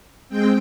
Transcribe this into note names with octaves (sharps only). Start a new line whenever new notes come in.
G#3 C4 G5